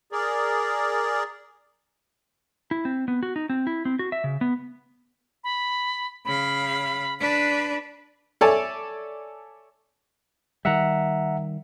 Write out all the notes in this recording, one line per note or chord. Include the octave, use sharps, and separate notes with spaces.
G#4 A#4 D5
E4
C4
B3
F#4
D#4
C4
E4
C4
F#4
E5
C#3
B3
B5
C#3 F5 B5
D4 B4 B6
A4 C#5 D5 E5 G#5 A5
D#3 G3 E5 F#5 A#5